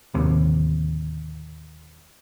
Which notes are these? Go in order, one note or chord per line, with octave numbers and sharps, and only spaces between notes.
D1 D#2 C3